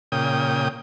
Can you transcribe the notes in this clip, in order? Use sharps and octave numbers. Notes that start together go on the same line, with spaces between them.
A#2 C#3 G5 D#6